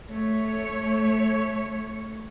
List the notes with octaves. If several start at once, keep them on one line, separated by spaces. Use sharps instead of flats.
A3 C#5